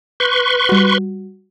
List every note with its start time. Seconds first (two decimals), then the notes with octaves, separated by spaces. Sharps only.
0.20 B4 C6 C#6 G6
0.69 G3 F#4